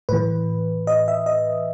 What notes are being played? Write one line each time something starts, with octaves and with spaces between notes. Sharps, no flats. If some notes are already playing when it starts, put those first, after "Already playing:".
A2 E3 B4
D#5
E5
D#5